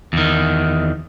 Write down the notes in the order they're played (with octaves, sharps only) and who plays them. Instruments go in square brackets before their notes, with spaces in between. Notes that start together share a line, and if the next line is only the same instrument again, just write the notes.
[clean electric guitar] E2 D#3